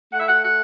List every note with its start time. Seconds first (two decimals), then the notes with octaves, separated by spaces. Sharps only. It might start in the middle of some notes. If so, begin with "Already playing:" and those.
0.13 A3 F#5
0.20 E5
0.28 F#5
0.43 F#5